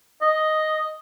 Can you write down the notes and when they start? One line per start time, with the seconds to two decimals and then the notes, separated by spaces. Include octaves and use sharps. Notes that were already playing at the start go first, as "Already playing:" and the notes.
0.21 D#5